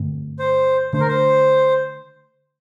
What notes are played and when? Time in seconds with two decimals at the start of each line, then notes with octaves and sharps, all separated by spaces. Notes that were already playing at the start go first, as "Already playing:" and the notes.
Already playing: G2 D3 A3 C4
0.39 C5
0.93 D3 A3 D4 C5
1.00 A#4
1.08 C5